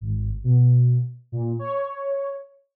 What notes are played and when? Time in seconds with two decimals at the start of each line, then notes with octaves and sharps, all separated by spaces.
0.01 G#1
0.44 B2
1.32 A#2
1.59 C#5